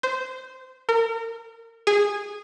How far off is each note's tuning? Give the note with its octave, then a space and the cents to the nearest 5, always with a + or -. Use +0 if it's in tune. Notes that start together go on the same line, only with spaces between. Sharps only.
C5 -15
A#4 -30
G#4 -15